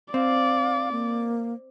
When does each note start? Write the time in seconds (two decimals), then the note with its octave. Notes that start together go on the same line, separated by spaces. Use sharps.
0.14 C4 D5 F5
0.92 A#3